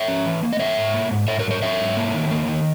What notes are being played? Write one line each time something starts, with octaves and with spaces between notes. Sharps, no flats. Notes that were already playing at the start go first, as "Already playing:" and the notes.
Already playing: C#5 E5
C#4
E3
A#3
D#5
E3 C#5 E5
G#2
A#3
G#2
G#2 C#5 E5
A#4 C#5
F#3
A#4 C#5
F#3 C#5 E5
G#2
A#3
D#3
A#3
D#3